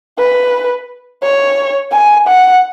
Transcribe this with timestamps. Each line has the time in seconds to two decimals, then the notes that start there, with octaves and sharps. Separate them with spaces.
0.18 B4
1.22 C#5
1.92 G#5
2.28 F#5